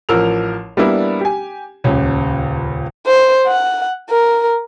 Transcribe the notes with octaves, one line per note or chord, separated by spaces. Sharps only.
A1 F3 A#4 E6 F7
G3 A#3 B3 D4 E4
G4 G#5
D#1 C#2 C#4
C5
F#5
A#4